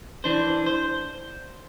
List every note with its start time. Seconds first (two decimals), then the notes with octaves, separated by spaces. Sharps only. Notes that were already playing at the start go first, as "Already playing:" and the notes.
0.24 E3 D4 C5
0.66 C5